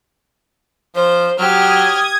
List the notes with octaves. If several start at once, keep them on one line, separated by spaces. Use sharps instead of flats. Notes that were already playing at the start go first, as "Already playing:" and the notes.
F3 C5
F#3 G4 D#6 F6 G#6